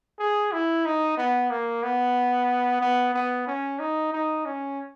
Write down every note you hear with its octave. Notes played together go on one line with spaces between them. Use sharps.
G#4
E4
D#4
B3
A#3
B3
B3
B3
C#4
D#4
D#4
C#4